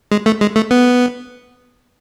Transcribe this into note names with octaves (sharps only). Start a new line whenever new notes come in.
G#3
A3
G#3
A3
B3